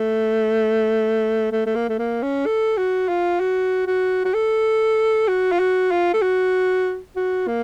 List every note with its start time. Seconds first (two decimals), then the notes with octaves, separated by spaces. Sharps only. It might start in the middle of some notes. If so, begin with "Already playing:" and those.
Already playing: A3
1.52 A3
1.66 A3
1.75 A#3
1.89 A3
1.99 A#3
2.23 C#4
2.46 A4
2.77 F#4
3.09 F4
3.40 F#4
3.87 F#4
4.25 F#4
4.34 A4
5.28 F#4
5.52 F4
5.59 F#4
5.91 F4
6.14 A4
6.22 F#4
7.16 F#4
7.47 A#3